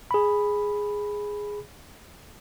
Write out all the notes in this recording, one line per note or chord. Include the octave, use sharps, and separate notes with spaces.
G#4 B5